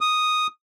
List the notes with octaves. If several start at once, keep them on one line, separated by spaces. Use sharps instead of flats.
D#6